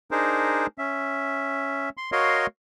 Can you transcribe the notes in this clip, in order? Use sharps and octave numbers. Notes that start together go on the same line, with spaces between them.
D4 D#4 G#4 A#4 C5
C#4 E5
C6
F#4 A#4 C#5 D#5 F5 C6